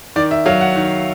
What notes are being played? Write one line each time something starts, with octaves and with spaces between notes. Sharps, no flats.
D#3 D5
E5
F#3 F5
F#5
D#3